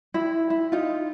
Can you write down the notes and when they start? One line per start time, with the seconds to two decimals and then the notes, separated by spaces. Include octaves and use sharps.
0.14 E4
0.50 E4
0.72 D#4 F4